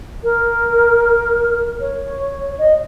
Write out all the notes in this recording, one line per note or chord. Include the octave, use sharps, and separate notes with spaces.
A#4
C#5
D#5